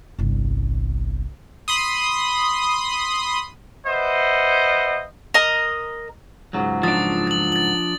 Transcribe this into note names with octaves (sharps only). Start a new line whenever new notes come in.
G1 C2
B5 C6 D#6
B4 C5 D#5 E5 F#5
A#4 D#5 A#5
C#2 G#2 F#3
F3 D4 D#6 A6
A6 F#7
A6 F#7